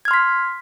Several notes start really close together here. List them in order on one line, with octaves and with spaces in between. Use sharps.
G#6 F6 C6 B6